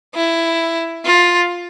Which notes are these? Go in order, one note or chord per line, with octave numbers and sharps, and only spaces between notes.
E4
F4